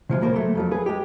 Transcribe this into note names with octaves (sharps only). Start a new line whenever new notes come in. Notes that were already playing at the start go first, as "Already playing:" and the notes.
C3 F3 F#3 G#3
C#2 A2 A#3 A#4 C5
F#3 A3
F2 F3 F#3
G#4 B4
G#3 G4